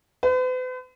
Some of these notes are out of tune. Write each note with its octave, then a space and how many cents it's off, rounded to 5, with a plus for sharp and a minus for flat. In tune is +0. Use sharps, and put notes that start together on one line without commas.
B4 +45